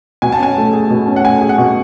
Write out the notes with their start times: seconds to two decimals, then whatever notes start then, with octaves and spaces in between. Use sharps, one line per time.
0.22 B2 G#5
0.32 A5
0.39 C#4 G#5
0.57 A3
0.73 G#4
0.90 B2
1.07 C#4
1.16 F#5
1.24 A3 G#5
1.41 G#4
1.49 F#5
1.58 B2